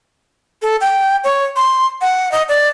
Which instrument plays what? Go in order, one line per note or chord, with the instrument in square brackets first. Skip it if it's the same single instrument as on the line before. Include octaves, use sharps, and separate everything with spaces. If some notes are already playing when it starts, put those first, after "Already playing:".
[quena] A4
G5
C#5
C6
F#5
D#5
D5